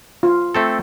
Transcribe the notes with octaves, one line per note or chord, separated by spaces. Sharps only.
F4
A3 C4 A4